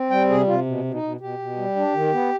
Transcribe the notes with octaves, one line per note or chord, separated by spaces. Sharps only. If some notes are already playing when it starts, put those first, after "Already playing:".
Already playing: C4
G3 G5
C3 G#4
C3 F4
B2
B2
D#4
B2
B2 G4
B2
G3
D4
D#3
B3